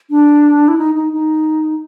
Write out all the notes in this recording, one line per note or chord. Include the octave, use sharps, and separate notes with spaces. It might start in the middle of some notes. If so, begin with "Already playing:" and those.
D4
E4
D#4
D#4
D#4